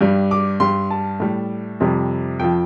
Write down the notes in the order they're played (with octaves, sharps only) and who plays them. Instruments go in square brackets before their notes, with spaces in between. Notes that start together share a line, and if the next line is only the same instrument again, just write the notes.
[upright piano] G2 G3
D6
G2 G3 C6
A5
A2 G3
F2 C3 G3
F2 F3 G5